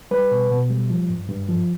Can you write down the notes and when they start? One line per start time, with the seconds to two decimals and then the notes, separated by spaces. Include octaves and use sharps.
0.11 G3 B4
0.31 B2
0.51 B2
0.70 G3
0.90 F3
1.09 G2
1.29 G2
1.49 F3